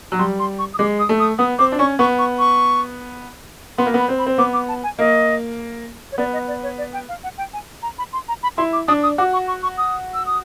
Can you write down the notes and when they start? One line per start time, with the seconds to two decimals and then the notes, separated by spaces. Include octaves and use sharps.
0.12 F#3
0.19 G3 C6
0.39 C6
0.59 C#6
0.74 D#6
0.78 G#3 D6
0.99 D#6
1.09 A3
1.20 D#6
1.38 B3 D#6
1.59 C4 D6
1.72 D4
1.79 C#4 C#6
1.99 B3 C#6
2.19 C#6
2.39 C#6
3.78 B3 C6
3.86 A#3
3.94 B3 B5
4.09 C4
4.19 B5
4.26 C4
4.38 B3 D6
4.53 D6
4.68 A5
4.84 G#5
4.99 A#3 D#5
6.12 C#5
6.18 B3 D5
6.33 D#5
6.48 D5
6.63 C#5
6.78 D5
6.93 G5
7.09 F5
7.24 F#5
7.38 G5
7.53 G#5
7.83 A#5
7.98 B5
8.13 C6
8.28 A#5
8.43 B5
8.57 E4 C6
8.73 D6
8.88 D4 D#6
9.03 D#6
9.18 F#4 D6
9.33 C#6
9.48 C#6
9.63 C#6
9.78 D#6
10.14 E6
10.26 D#6